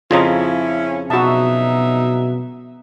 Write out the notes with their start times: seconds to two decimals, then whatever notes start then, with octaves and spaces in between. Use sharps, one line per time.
0.11 F2 C#3 F3 C#4 E4 F4 D#5 A#5
1.10 B2 F#3 D#4 F#4 E5 A5